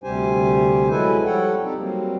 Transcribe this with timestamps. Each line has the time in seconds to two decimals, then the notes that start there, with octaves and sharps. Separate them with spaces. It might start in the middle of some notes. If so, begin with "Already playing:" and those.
0.04 D2 C3 G3 G4 C5 G#5
0.90 F#3 G#3 E4 A4 B4 G#5
1.25 F3 G3 A4 C#5 F#5 G5
1.63 C4 D#4 G4 A4
1.78 F#3 G3 A#3 C4